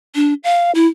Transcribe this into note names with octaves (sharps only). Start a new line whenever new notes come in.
D4
F5
E4